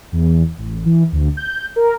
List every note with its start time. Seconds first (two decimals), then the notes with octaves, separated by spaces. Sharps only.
0.12 E2
0.57 A1
0.85 E3
1.12 D2
1.37 G6
1.76 A#4